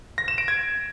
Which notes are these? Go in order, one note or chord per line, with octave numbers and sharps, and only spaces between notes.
A#6
E7
D7
G#6